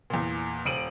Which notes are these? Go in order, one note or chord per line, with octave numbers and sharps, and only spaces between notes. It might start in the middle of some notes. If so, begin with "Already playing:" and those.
E2 A#2
D#1 D7 D#7 F#7